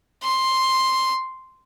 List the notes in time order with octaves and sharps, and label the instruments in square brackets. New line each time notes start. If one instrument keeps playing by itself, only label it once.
[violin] C6